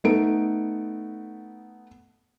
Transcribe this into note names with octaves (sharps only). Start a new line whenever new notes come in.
A3 B3 D#4 A4 D7